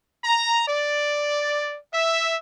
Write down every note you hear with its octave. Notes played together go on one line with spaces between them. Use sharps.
A#5
D5
E5